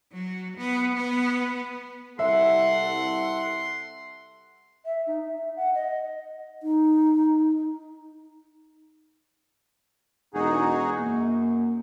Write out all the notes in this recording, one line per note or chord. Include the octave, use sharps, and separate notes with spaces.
F#3
B3
B3
C2 A4 E5 F#5 C6
E5
D#4
E5
F#5
D#5
D#4
E1 D#4 F#4 G#4
F#2 A#3